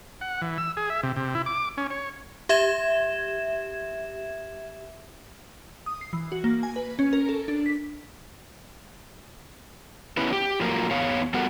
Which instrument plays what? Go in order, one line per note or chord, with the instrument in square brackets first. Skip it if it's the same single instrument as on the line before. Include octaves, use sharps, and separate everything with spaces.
[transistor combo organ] F#5
E3
E6
G#4
E5
C3
C3
E4
D6
C#4
C#5
[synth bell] G4 E5 G#6 E7
D#6
C7
E3
F#4
A#3
G#5
B4
C#4
A#4
A4
D4
B6
[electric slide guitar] B3 C#4 E4 B4
G4
F3 F#3 A3 A#3 A#4
E2 B3 C#5 F5
G3 B3 F#4 A4 A#4 F#5